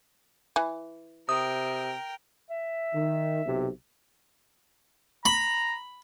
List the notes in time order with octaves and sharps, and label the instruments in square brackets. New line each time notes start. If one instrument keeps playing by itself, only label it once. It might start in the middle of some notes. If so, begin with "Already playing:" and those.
[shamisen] E3
[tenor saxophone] C3 [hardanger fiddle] A#4 G5 [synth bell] D#6
[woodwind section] E5
[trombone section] D#3
B1 C3
[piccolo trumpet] A#5 [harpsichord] B5